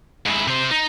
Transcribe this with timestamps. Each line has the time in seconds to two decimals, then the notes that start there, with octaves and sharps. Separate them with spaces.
0.26 G#2 E4
0.48 C3 C5
0.71 D#4